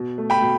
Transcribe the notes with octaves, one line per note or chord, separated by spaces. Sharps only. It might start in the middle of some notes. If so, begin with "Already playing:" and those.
Already playing: B2
A3
G5 B5
B2